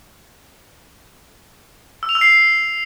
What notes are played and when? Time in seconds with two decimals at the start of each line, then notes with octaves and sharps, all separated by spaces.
2.03 E6
2.09 F7
2.15 E6
2.21 C7